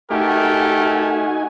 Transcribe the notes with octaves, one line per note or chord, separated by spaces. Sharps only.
A3 D#4 F#4 G4 A#4 G#5